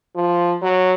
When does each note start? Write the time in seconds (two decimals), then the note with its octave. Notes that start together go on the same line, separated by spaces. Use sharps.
0.16 F3
0.62 F#3